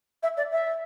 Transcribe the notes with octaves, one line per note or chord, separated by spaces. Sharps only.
E5
D5
E5